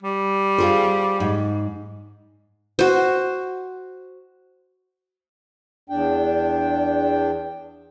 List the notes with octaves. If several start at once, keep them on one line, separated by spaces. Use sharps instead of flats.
G3
F4 G#4 C5
G#2
F#4 C5
E2 D4 G5